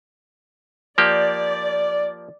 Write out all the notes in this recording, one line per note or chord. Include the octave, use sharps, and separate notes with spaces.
F3 A#3 G4 D5